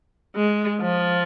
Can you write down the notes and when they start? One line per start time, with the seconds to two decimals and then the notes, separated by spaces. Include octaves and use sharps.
0.36 G#3
0.81 F3